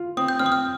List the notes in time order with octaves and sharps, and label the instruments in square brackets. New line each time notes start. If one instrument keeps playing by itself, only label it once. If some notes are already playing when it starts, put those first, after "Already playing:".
Already playing: [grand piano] F4
[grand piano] C4 [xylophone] D#6
[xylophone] G6
[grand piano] C4 [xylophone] F6
[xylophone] D#6
F6